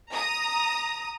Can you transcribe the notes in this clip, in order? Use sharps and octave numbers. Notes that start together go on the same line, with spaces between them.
A#5 D#6